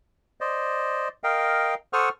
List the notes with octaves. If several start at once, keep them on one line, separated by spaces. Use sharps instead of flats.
C5 D5 D#5
A#4 D#5 F5 G5
A4 C5 F#5 C#6 D#6 F6